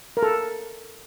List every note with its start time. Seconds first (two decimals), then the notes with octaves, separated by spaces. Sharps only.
0.17 A#4
0.23 A4